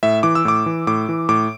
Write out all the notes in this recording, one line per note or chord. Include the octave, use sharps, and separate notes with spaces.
A2 E5
E3 D6
E6
A2 D6
E3
A2 D6
E3
A2 D6